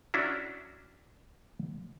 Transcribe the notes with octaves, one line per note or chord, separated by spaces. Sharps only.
C#4 D4 E4 F#4